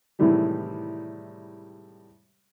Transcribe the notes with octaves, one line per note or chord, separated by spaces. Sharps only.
A2 C3 D#3 E3 G3 G#3